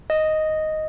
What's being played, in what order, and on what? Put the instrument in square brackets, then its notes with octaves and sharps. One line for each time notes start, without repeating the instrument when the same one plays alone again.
[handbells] D#5